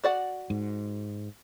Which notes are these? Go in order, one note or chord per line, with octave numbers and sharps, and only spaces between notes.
F#4 D5 F#5
G#2